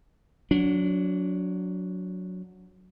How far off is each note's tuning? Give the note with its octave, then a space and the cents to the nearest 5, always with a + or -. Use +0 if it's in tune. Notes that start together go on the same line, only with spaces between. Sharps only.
F#3 -10 D4 -30